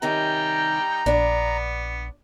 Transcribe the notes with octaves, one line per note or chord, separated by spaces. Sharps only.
C3 D#3 G3 C#4 D#4 G5 A#5
A#1 B3 D4 D5